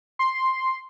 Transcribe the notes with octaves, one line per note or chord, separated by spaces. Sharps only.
C6